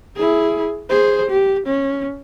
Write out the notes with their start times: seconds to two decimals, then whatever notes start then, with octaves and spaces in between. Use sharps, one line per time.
0.16 E4 G#4
0.90 G#4 C5
1.30 G4
1.66 C#4